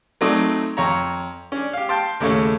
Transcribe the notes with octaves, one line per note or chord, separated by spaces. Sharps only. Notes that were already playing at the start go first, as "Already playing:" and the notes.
F#3 A3 C4 D#4 D5
F2 C#5 A#5
C#4 D4
G4 F5
F5 G5 A5 C6
D#2 A2 C#3 A4 C#5